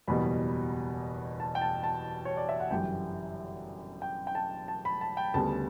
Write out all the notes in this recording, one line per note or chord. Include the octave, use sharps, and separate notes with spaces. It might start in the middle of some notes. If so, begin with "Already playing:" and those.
F#1 E2 B2 G3 B3 B5
A5
G5
A5
A5
C#5
D5
E5
F#5
G1 F#2 E3 G3 G5
G5
G5
A5
A5
B5
A5
G5
D2 C#3 G3 B3 A5